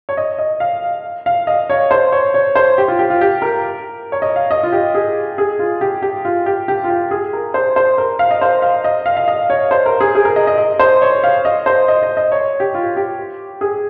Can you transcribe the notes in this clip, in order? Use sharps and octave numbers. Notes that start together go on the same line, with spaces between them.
C#5
D#5
D#5
F5
F5
D#5
C#5
C5
C#5
C#5
C5
G4
F4
G4
F4
G4
A#4
C#5
D#5
F5
D#5
F4
G4
G#4
G#4
F4
G4
G4
F4
G4
G4
F4
G4
G#4
A#4
C5
C5
A#4
F5
D#5
C5
F5
D#5
F5
F5
D#5
C#5
C5
A#4
G#4
G#4
A#4
D#5
D#5
D#5
C5
C#5
F5
D#5
C5
D#5
D#5
D#5
C#5
G4
F4
G4
G#4